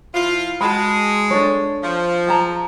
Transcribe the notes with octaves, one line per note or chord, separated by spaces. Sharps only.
F3 E4 F4
G#3 F#4 A5 B5
D4 A4 C#5
F3
G#4 A5 A#5